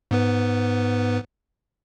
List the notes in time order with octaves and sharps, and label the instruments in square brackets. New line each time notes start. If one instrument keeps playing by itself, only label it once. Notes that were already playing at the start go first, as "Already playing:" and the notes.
[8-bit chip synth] G#2 B3 B4